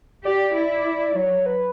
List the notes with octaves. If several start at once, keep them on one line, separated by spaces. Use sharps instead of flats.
G4 D5
E4
F#3 C#5
B4